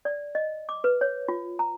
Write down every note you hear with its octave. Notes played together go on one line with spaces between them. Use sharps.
D5
D#5
D6
B4
C#5
F4
A#5